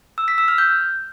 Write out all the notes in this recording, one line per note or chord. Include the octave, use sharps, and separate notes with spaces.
E6
B6
E6
F6
G6